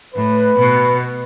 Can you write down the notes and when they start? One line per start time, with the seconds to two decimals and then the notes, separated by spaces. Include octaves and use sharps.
0.15 A2 B4
0.58 B2